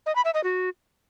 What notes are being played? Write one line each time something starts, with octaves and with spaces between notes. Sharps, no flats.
D#5
B5
E5
D#5
F#4